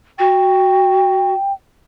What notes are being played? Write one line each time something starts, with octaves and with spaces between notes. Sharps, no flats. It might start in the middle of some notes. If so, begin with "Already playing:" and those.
F#4 G5